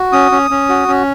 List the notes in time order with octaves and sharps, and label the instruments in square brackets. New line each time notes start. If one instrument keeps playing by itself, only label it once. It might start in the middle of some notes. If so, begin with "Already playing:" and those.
Already playing: [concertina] F#4
C#4 D#6
C#4
C#4
F#4
C#4